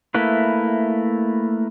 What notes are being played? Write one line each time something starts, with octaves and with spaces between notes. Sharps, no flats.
A3 A#3 E4 B4